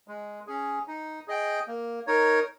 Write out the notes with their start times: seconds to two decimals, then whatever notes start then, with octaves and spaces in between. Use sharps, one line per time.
0.08 G#3
0.47 C#4 G#4
0.87 D#4
1.28 G#4 D#5 G5
1.68 A#3
2.07 D#4 A#4 C#5